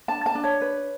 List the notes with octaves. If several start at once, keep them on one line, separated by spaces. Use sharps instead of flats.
D4 A5
A5
D4
C#5
B4